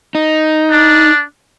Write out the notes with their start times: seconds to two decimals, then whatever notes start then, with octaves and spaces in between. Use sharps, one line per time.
0.15 D#4
0.71 D4